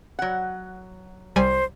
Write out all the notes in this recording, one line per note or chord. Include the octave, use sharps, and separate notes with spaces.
F#3 F#5
C2 G3 C5 G#5